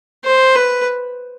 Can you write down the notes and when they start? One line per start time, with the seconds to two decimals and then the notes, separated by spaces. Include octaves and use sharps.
0.24 C5
0.55 B4